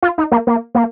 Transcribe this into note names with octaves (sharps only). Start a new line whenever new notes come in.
F4
D#4
A#3
A#3
A#3